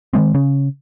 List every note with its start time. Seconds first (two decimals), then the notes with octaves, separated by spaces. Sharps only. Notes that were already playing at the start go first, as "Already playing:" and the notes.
0.13 D#3 E3 G#3 C4
0.34 C#3 C#4